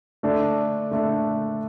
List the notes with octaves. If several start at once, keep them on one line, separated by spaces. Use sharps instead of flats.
D3 A3 D4 A4
D3 A3 D4 A4